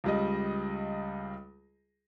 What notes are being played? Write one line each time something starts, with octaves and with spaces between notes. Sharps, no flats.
C#2 G3 D#5